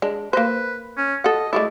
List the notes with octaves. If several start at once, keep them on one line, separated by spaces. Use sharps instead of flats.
G#3 D4
A#3 B4 C5
C#4
A4 D#5 F#5
G#3 A3 E4 D5